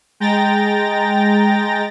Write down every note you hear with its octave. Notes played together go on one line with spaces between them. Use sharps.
G#3 G5 A#5 A6 A#6